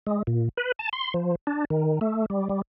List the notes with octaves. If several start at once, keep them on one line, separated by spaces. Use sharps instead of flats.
G#3
A#2
B4
A5
C6
F3
D4
D#3
A3
G3
G3